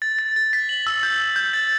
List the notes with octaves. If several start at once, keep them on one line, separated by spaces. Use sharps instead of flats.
A6
A6
A6
B6
F#7
E6
G6
G6
G6
A6